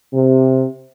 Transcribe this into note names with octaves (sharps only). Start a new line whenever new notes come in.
C3